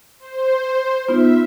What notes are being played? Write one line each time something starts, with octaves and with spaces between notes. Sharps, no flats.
C5
B3 D#4 F4 E5